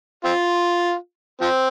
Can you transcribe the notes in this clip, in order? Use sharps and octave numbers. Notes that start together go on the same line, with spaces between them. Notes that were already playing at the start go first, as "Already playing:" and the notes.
C4 F4
F3 C4